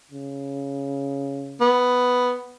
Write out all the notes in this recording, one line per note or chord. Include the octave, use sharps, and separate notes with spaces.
C#3
B3